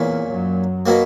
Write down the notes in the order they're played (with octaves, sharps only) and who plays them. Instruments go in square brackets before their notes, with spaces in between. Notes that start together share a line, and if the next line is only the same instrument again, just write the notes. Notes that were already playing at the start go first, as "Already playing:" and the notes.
Already playing: [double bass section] E2 E3 [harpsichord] A#2 A#3 C#4
[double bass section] F#2 F#3
[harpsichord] B2 F#3 A#3